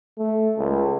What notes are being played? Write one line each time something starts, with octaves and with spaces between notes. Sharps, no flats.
A3
C#2